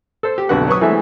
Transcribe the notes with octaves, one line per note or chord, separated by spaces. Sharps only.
A4 C5
G4
B1 F2 D3 F#4 B4 F#5
F#3 B4 C#6 D#6
E3 G#3 A3 C4 A4 E5